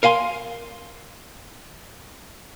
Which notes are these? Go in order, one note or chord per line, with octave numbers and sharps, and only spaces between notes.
A#4 F5 G#5 C6